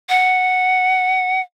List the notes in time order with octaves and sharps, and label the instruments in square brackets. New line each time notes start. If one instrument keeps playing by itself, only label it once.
[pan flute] F#5